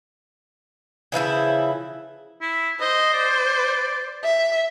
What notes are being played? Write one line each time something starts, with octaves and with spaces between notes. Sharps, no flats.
C#3 E3 F3 E4
E4
C5 D#5
D5
E5